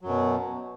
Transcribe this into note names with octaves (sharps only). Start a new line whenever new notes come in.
F#2 B2 F#3